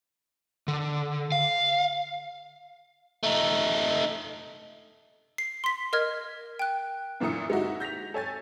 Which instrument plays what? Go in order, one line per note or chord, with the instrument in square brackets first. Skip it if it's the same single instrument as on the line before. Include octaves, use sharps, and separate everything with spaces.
[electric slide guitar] D3
F5
[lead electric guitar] A3 D#4
[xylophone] C7
C6 B6
A#4 D#5 F6 G#6
G5 F#6
[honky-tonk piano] F#2 A#2 D3 E4 D#6 C#7
G#3 D#4 E4 F#4 E5
G6 A#6 B6 F7
A4 C#5 G#5 A6